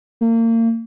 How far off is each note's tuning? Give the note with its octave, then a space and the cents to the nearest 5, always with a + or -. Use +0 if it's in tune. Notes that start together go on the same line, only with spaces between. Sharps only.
A#3 -35